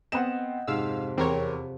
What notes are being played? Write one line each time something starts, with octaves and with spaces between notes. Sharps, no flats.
B3 C4 D#5 F#5 E7
F2 G#2 C3 F5 E6
E2 C4 A#4 C#5